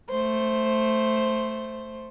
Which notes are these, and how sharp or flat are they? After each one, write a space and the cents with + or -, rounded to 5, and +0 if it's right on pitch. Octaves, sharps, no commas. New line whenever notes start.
A3 +0 C5 +0